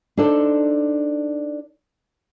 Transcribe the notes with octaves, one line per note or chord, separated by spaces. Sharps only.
D4 D#4 A4 C5 D5